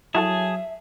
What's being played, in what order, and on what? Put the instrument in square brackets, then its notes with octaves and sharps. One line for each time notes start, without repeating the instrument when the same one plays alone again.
[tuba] F#3 [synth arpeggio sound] E4 F#4 A4 [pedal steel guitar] G#4 A5 [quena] E5